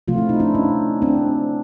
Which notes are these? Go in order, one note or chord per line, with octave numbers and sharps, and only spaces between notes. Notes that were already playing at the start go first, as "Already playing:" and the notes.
C3 F3 A3 F4
E4
D#4
D4 E4
C#4 D#4
C4 D4